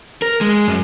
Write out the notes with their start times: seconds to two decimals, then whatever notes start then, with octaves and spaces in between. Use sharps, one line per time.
0.22 A#4
0.41 G#3
0.68 F#2